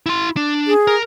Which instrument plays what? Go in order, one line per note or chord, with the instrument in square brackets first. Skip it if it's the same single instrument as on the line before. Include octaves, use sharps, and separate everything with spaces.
[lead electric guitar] E4 C6
D4
[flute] G#4
[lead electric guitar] A#4